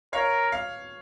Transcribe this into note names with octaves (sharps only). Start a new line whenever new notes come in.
A#4 C#5 F5
F5